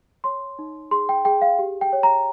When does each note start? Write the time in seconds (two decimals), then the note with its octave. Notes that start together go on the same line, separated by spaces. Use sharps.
0.24 C#5 C6
0.59 D#4
0.91 G#4 C6
1.09 G5
1.25 G#4 G5
1.42 F5
1.59 G4
1.81 G5
1.93 C#5
2.03 A#5